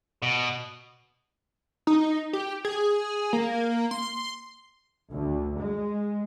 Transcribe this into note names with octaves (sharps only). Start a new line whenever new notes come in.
B2
D#4
G4
G#4
A#3
C6
D2
G#3